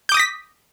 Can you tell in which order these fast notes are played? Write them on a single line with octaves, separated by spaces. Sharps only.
G6 D6 D#6 A#6 B6